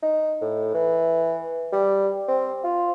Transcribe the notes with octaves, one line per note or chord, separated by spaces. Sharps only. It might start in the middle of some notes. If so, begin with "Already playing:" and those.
D#4
A2
E3
G3
C4
F4